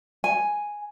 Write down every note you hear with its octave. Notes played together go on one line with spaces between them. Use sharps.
G#5